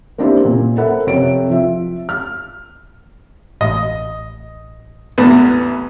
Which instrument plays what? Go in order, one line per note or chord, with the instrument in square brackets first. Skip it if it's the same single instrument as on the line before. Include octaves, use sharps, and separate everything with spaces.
[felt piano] A#3 C4 D4 E4 G4 C5
A#2
A4 A#4 C5 E5 F#5 B5
F2 C3 C4 A4 C#5 D7
F3 E5
F6
[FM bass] A1 [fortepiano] D#5
[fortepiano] A1 E2 B3